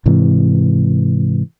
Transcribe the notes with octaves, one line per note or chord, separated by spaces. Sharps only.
G#2 C3 E3